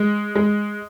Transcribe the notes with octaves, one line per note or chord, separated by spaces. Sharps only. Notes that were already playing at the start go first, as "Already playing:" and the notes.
Already playing: G#3
G#3